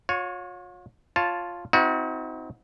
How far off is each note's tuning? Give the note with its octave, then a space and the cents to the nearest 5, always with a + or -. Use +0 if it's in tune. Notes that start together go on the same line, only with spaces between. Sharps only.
F4 +45 C#5 +0
F4 +0 C#5 +0 A5 +0
C4 -15 D#4 +40 F#4 -25